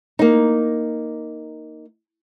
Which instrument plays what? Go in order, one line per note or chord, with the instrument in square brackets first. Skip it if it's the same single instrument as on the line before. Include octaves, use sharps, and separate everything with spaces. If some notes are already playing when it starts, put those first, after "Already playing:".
[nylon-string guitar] A#3 D#4